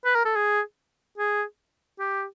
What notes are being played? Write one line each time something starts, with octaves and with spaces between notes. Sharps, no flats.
B4
A#4
A4
G#4
G#4
G4